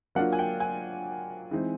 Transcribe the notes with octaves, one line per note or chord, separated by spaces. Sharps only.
F#3 A#3 D4 F4 F#5
G#5
G5
G#5
E3 G#3 C4 D#4